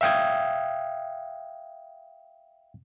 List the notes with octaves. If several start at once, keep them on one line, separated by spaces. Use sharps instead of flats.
E5 F5 G5 D#6 G#6